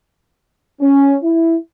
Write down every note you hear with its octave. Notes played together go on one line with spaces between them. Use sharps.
C#4
E4